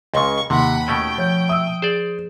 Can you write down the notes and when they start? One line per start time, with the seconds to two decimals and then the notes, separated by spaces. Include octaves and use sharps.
0.14 C#2 C#3 D#5 C6 C#6
0.50 D#2 C3 F#5 B5 C6
0.88 B2 A3 C#4 G5
1.18 F3 C#5 G6
1.49 E5 D#6 E6
1.82 G#4 C5 D5